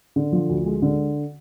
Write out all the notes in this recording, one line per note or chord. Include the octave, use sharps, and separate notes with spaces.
D3
F3
D2
G#3
D3